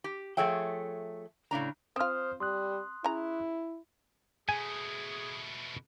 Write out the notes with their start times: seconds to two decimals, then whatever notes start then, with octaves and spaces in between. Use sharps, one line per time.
0.04 G4
0.37 F3 A3 G#4 C#5 E5 G5
1.51 A2 C#3 D4 A#5
1.96 C4 F4 C5 D#6 F6
2.40 G3 C6 D#6 F#6
3.04 C#3 E4 A#5
4.49 B2 A3 G#4 G#5